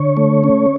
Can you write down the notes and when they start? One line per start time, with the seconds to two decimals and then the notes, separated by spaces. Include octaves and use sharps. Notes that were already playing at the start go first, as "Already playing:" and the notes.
Already playing: D3 C#5
0.17 A3
0.44 C#4